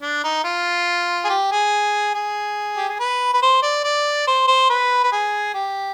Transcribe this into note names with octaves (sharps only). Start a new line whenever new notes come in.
D4
D#4
F4
G#4
G4
G#4
G#4
G4
G#4
B4
B4
C5
D5
D5
C5
C5
B4
B4
G#4
G4